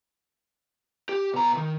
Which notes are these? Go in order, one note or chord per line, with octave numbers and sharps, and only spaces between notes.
G4
B2 A#5
D#3